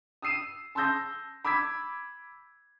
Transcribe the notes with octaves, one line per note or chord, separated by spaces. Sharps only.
D#6 E6 C7 D#7 E7
A5 C6 D#6 E6 G6 A#6
B5 D6 E6 G#6 B6